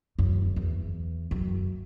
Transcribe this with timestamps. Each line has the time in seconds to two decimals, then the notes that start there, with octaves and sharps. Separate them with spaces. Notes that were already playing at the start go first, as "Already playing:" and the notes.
0.19 F#2
0.56 E2
1.31 F#2